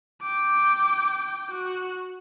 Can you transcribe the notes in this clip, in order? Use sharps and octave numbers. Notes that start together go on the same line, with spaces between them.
G5 D6
F#4